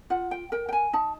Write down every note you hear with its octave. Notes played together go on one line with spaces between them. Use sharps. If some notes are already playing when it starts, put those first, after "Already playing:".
F4 F#5
G5
A#4 G5
G5
G#5
D#4 A5